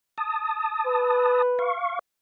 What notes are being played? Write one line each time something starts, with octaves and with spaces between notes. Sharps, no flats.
A5 D#6
B4
F5 C#6